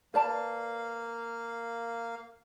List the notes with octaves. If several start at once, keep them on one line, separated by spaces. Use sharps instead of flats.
A#3 B4 D5 F5 A5